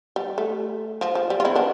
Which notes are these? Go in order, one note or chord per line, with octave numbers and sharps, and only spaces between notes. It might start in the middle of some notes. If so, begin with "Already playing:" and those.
G3
A3
F3
F3
G3
F4
C4 E4
B3 D4